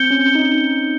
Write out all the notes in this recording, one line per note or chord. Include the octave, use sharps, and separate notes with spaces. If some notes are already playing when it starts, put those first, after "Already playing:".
Already playing: C4 G6 C#7 G7
C#4
D#4